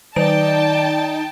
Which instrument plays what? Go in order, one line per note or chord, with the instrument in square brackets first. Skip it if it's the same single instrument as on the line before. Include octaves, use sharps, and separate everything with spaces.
[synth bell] D#3 D7 [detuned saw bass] D#4 [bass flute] D5 [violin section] G5 A5